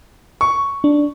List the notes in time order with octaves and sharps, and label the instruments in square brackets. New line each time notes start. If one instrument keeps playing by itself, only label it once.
[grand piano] C#6
[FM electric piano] D4